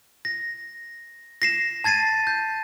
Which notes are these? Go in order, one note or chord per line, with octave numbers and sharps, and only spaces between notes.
A#6
A#6 C7 E7
A5 G#6 A6 C7 D#7
G6